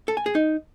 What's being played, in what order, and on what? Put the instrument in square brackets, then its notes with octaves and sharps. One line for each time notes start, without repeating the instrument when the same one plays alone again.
[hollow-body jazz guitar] A4
G#5
G#4
D#4